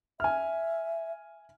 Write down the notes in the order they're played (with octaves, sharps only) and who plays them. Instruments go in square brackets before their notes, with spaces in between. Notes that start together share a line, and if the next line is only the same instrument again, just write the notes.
[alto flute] E5 [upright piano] G#5 F6